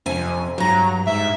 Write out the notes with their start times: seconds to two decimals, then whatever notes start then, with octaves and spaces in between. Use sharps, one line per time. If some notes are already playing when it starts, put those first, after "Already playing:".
0.06 F2 C3 G#5
0.58 G2 F#3 A#5
1.07 G#2 E5